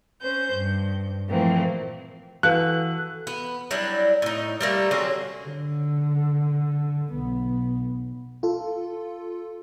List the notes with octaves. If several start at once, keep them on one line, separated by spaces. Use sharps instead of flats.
C#4 C5 G6
G2
A#2 E3 F3 A3 A#3 C4
E3 F#4 A4 B4 F5 A5 F#6
B3
F#3 G3 D4 E4
A2 D#4
G3 A3 A#3
D3 F#3 C4 C#4
D3
B1 B3
F4 A4